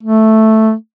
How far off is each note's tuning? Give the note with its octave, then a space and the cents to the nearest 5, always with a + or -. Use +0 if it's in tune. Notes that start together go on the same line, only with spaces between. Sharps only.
A3 +0